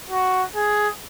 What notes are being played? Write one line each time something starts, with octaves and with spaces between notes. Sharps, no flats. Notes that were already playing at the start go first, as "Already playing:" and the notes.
F#4
G#4